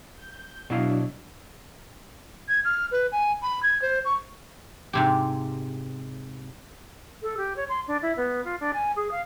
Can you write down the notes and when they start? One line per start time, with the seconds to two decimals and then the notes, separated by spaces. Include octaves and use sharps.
0.13 G6
0.70 B2 F#3 D4 E4 F5
2.49 G#6
2.65 F6
2.91 B4
3.12 G#5
3.43 B5
3.63 G#6
3.82 C5
4.05 C#6
4.93 G#2 C3 G4
7.22 A4
7.37 G4
7.56 C#5
7.69 C6
7.88 D4
8.02 E4
8.17 B3
8.44 F4
8.60 D4
8.74 G#5
8.96 G#4
9.11 F5